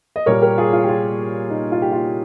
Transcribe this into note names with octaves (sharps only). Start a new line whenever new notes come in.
D#5
A#2 G3 A#3 A#4 C#5
G4 A#4
F4 G#4
F4
G4
F4
D#4
F4
G4
F4